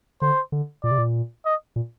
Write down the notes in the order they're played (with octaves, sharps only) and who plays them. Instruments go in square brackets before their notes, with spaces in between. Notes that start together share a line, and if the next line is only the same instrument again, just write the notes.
[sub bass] D3 [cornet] C5
[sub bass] D3
[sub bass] A#2 [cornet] D5
[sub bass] C3
A#2
[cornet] D#5
[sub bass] A#2